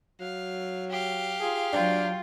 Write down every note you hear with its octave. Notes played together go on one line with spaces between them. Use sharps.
F#3 F5
G4 F5
F4 G#4
F#3 D4 F4 G5